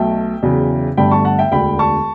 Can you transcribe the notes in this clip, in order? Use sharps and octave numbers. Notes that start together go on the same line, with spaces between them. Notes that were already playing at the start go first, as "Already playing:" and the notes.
Already playing: B1 B2 F#3 A3 E5 G5
E2 C#3 F#3
G1 G2 D3 A3 G5 B5
A5 C#6
F#5 A5
E5 G5
E1 D2 D3 G5 B5
A5 C#6